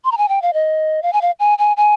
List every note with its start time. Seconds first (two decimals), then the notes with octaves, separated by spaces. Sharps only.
0.05 C6
0.12 A#5
0.18 G#5
0.29 G5
0.42 F5
0.54 D#5
1.03 F5
1.13 G#5
1.22 F5
1.40 G#5
1.58 G#5
1.77 G#5